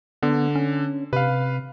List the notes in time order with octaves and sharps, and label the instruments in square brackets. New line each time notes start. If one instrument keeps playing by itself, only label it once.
[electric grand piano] D3 [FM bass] B3
[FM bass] C#4
[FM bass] C3 [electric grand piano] B4 F5